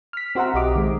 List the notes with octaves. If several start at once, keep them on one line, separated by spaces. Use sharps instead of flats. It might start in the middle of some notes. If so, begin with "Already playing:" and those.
F6 B6
C4 F#4 C5 E5 F#5 A#5
B1 G4 D#5 D6
D#3 G#3